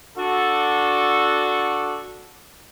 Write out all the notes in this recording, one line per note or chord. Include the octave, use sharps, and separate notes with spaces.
D4 F#4 A4